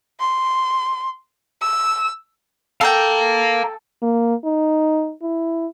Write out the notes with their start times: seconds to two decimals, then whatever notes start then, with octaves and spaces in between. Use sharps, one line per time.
0.20 C6
1.62 E6
2.81 A4 F5 G5 A#5
4.02 A#3
4.45 D#4
5.23 E4